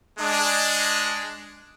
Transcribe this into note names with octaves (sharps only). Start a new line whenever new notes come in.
G#3 D4